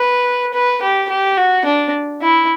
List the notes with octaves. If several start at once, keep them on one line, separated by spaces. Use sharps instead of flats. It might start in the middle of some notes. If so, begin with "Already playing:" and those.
Already playing: B4
B4
G4
G4
F#4
D4
E4